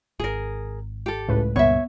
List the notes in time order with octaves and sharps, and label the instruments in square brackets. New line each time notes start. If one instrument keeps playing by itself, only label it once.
[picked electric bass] D1 G#1 [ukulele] G#4 A#4
[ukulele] G4 A4
[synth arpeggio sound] C#2 A2 B4
[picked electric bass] C#2 G2 A#2 [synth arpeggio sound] B3 [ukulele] C#5 E5